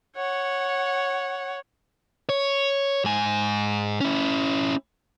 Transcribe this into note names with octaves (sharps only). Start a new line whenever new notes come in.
C#5 F#5
C#5
G#2 G#5
C#4 E4